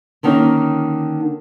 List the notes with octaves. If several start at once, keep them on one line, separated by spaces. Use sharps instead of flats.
D3 D#3 A#3 C#4 D#4